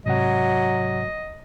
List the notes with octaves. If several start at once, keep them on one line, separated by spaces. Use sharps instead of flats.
G#2 C3 F#3 D#5 F#5